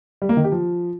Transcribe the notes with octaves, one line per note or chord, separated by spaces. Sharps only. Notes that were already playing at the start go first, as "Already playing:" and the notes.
G3
A#3
D#3
G4
F3